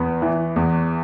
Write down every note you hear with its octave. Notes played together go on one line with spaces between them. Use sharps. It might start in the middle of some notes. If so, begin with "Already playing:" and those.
Already playing: E2 B3
E3
E2